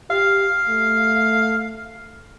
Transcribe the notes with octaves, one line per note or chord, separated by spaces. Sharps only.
G4 F5
A3